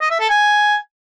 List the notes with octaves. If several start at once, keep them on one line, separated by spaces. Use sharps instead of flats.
D#5
E5
A4
G#5